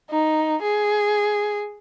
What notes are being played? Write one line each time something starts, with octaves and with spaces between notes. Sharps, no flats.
D#4
G#4